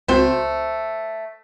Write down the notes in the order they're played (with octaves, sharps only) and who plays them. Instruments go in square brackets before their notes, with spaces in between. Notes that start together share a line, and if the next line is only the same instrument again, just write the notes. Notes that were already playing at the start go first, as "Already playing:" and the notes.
[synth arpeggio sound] C#2 C4 F#4 [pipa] A3 C5